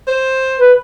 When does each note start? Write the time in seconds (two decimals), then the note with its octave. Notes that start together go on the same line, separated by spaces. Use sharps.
0.08 C5
0.60 B4